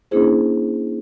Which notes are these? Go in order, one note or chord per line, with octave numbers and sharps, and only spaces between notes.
A#3 C#4 D4 E4 G#4 C5